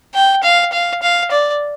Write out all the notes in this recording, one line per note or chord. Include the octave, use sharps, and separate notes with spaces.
G5
F5
F5
F5
D5